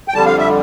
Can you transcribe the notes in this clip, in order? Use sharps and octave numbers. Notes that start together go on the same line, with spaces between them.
G5
F2 D3 G3 A5
F5
E5